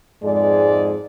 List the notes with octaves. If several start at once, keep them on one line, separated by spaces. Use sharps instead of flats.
F2 G#2 G#3 G#4 D5